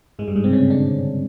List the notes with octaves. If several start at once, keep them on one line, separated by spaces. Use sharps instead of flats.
G#2 G#3
G2 G3
G#2 G#3
C3 C4
C#3 C#4
D3 D4